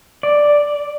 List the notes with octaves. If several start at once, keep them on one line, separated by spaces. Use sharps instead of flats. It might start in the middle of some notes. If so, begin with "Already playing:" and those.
D5